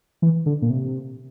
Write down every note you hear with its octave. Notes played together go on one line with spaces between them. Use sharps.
E3
D3
A#2
C3